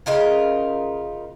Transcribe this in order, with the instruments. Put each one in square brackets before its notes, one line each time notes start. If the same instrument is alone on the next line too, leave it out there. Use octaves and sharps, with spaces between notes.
[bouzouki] C#3 D#4 F4 A#4